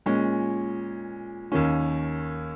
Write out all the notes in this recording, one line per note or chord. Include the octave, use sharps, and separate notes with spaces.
A#2 G#3 C#4
D#2 D#3 A#3 C#4